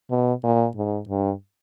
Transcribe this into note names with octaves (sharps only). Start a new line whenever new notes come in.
B2
A#2
G#2
G2